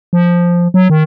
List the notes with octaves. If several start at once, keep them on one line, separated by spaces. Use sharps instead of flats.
F3
F#3
D#3